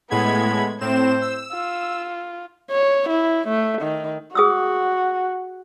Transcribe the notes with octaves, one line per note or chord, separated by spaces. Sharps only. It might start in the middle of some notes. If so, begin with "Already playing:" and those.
A2 G#3 B3 B5 G#6
A2 C4 C5 E7
E6
F4
C#5
E4
A3
D#3
F#4 G#4 D#6 E6